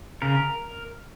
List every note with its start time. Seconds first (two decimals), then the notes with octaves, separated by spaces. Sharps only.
0.22 C#3 A#4